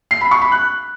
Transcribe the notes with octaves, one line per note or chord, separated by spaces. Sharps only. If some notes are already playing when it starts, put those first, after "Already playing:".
C7
B5
C#6
B5
F#6